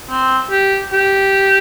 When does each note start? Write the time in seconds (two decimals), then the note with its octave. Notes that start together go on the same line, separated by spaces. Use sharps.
0.10 C4
0.51 G4
0.93 G4